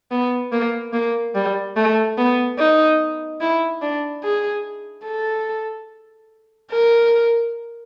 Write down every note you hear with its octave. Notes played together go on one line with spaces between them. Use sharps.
B3
A#3
A#3
G3
A3
B3
D#4
E4
D4
G#4
A4
A#4